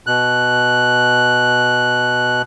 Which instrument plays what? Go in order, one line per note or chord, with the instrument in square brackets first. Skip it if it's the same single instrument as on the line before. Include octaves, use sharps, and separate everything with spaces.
[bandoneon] B2 F#6